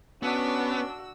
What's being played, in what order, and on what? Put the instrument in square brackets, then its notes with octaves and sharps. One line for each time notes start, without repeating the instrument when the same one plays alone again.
[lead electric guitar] B3 [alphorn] C#4 [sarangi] D4 [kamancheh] F#4 E6